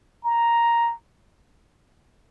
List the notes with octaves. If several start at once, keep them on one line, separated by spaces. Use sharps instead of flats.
A#5